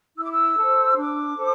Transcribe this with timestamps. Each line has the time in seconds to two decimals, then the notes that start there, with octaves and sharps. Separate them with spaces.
0.16 E4 E6
0.23 D6
0.31 E6
0.57 A4 C5
0.97 D4 D6
1.36 A4 C5